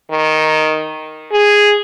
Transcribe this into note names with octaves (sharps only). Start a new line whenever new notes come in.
D#3
G#4